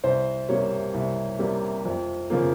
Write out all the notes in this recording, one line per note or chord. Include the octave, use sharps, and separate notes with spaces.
C2 C5
C3 G3 A#3 C#5
C2
C3 G3 A#3
F2
C#3 F3 A#3